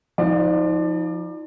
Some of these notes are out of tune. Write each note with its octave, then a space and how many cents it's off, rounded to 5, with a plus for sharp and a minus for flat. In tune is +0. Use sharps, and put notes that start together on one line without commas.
F3 +0 D#4 +30 D5 +25